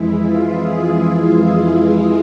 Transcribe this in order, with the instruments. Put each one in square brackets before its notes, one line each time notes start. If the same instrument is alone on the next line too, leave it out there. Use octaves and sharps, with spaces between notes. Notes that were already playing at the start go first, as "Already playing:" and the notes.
Already playing: [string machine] F2 E3 G#3 E4
F4
G#4